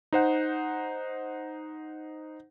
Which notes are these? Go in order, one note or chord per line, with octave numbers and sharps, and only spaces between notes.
D#4 C5 F#5